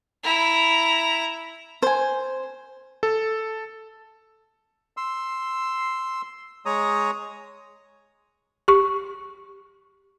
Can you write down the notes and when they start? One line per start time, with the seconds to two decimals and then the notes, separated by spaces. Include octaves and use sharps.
0.23 E4 A#5
1.82 C5 G#5
3.03 A4
4.97 C6 E6
6.66 G#3 C#5 A#5 D#6
8.68 G4 C#6